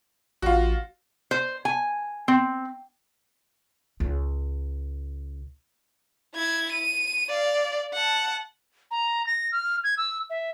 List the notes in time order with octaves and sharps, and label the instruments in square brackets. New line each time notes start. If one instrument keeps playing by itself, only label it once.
[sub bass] A1 [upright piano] F4 F#4
[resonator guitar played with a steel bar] C5
G#5
C4
[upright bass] C#2
[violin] E4 G#6
D#7
D5 F5
F#5 A5
[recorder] A#5
A#6
F6
G#6
E6
E5